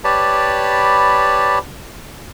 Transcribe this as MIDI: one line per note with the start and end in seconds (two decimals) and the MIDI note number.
0.04 1.59 67
0.04 1.59 71
0.04 1.59 73
0.04 1.59 74
0.04 1.59 81
0.04 1.59 83